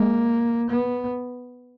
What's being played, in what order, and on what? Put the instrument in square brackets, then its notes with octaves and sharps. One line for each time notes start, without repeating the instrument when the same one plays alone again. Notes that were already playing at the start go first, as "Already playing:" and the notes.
Already playing: [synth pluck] G#3 [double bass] A#3
[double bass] B3